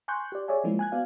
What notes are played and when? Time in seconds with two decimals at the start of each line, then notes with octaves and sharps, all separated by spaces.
0.08 G#5 C6 C#6 F#6 G6
0.32 G4 D5
0.48 G#4 C#5 D5 E5 G#5
0.64 F3 G#3 A#3 C4 E4
0.79 G#5 F#6 G#6
0.92 B3 F#4 D5 F5